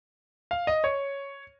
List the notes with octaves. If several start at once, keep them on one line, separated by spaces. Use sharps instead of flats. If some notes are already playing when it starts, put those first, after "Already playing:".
F5
D#5
C#5